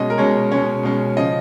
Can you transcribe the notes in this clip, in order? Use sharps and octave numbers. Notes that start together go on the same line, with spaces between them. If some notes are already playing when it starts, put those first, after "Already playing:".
Already playing: B2 G#3 C#4 D#5
A#4
B2 G#3 C#4 C#5
B2 G#3 C#4 C#5
B2 G#3 C#4
C#3 F3 D#5